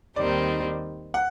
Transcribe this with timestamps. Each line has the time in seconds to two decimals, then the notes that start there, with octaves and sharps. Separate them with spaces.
0.16 D#2 D#3 G3 C4 D#4 D5
1.14 F#5